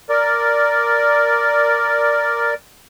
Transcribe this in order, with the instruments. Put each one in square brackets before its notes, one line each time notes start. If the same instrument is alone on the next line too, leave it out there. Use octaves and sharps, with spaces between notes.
[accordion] A#4 D5